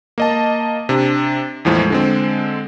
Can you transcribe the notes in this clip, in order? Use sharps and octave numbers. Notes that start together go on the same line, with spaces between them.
A#3 D#5 A5
C3 D4
E2 A2 F3 G#3
D3 G#3 C4